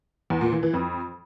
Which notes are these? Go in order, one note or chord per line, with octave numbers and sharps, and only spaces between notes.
E2
A#2
E3
E3
F2